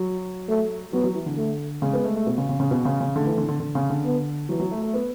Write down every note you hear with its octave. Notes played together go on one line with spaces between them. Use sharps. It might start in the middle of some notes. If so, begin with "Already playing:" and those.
Already playing: F#3
A3
F#3 B3
F#3
E3
D3
A3
C#3 G#3
B3
A3
A3
B2
C#3
C#3
C#3
B2
C#3
C#3
D3 A3
E3
D3
D3
D3
C#3
D3
B3
E3 F#3
F#3
A3
A3
B3